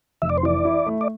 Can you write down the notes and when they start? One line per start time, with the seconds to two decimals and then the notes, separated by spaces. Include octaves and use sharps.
0.22 F1 E5
0.29 D5
0.38 C5
0.43 E3 D5
0.65 E4
0.86 A3
1.01 D5